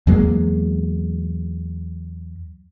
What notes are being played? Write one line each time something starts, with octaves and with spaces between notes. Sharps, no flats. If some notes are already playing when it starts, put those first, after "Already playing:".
E2 F#3 G#3 A#3